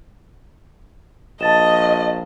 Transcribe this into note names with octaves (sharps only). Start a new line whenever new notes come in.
A#1 D#5 A5 A6 E7